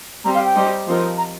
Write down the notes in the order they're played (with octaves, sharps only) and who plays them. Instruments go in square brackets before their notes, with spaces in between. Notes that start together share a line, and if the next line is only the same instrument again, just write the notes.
[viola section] G3 C4 G4 C5 [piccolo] A#5
[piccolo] F5
G5
[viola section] G3 D#4 G4 C5
F3 C4 D#4 A#4
[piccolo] A#5